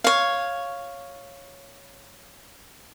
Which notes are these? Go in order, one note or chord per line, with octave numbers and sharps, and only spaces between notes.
C#5 F5